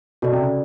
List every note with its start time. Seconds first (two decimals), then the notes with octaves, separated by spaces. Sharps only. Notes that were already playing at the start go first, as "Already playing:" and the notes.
0.22 B2 F#4 A4 D5
0.32 C3
0.42 C#3